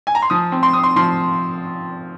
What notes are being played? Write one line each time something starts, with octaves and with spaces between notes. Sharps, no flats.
G#5
A#5
C6
F3 D#6
C4
C6
C4 D#6
C6
F3 C6